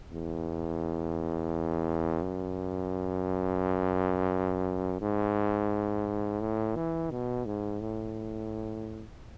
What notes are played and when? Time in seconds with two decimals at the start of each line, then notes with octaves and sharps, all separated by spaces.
0.13 E2
2.22 F#2
5.01 G#2
6.41 A2
6.76 E3
7.11 B2
7.46 G#2
7.81 A2